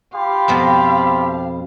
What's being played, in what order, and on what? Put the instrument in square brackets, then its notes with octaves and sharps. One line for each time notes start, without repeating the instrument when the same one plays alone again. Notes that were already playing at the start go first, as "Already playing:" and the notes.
[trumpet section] F4 G4 B5 [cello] F5
[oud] F2 B2 B3